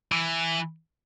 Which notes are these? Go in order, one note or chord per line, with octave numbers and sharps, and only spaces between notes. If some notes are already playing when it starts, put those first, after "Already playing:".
E3